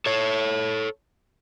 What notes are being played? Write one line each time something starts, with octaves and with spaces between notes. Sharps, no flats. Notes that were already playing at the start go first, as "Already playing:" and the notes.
A4 C#5